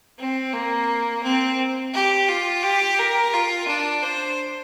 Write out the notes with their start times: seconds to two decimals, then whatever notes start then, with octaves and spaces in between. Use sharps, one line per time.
0.19 C4
0.53 A#3
1.23 C4
1.93 G4
2.28 F4
2.64 G4
2.99 A#4
3.34 F4
3.68 D4
4.02 C5